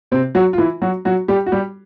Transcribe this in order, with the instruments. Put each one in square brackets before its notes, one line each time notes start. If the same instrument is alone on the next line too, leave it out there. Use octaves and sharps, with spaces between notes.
[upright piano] C3 C4
F#3 F#4
F4
E3 E4
F#3 F#4
F#3 F#4
G3 G4
F#4
G3 G4